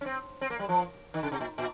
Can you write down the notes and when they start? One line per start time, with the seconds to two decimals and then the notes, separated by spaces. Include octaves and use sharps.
0.01 C#4
0.06 C4
0.41 C4
0.50 A#3
0.59 G3
0.69 F3
1.14 D#3
1.23 C#3
1.32 C3
1.40 A#2
1.58 A#2